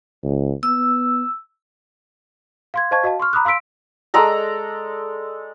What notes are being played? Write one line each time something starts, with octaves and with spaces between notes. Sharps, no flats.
C#2
B3 E6
F5 C6 G#6
C5 D#5 F5 A5 C#6 G#6
F#4 D#5 F5 A5
C6 C#6 F6
A#5 B5 D6 D#6 F#6
F5 C6 E6 B6 D7
G#3 A4 D5 A#5